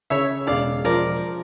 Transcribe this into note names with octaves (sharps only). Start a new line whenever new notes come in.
C#3 C#5 E5
E1 D5 F5
F3 A#4 D5